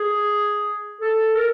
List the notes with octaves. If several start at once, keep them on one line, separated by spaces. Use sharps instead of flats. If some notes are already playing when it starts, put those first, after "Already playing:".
Already playing: G#4
A4
A#4